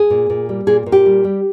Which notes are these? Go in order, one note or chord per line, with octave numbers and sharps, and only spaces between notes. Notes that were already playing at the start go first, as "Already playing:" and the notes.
Already playing: G#4
A#2
A#2
G3
A#2 G#4
A#2
G4
G3
G3